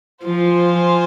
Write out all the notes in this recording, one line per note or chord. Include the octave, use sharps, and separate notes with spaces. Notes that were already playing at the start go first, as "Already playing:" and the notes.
F3 F4 C5 F5 G#5